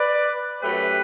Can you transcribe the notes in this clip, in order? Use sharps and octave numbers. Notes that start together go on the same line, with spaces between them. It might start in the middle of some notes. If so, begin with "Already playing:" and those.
Already playing: B4 D5
F#2 F#3 A3 G4 B4